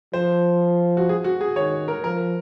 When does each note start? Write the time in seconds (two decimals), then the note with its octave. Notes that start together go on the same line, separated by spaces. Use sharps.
0.13 F3 C5
0.97 F#4
1.09 G#4
1.24 F#4
1.41 G#4
1.56 D#3 C#5
1.88 A#4
2.04 F3 A#4